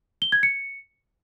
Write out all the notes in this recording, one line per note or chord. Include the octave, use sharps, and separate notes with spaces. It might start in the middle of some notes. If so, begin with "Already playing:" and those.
G7
G#6
C#7